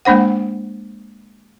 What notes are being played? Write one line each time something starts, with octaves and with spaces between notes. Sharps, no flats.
G#3 A#3 D4 C5 F#5